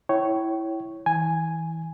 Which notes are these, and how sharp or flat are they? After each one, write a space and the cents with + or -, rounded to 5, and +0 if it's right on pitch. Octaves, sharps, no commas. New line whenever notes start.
E4 +0 C#5 +0 G5 -30
E3 -25 G#5 +0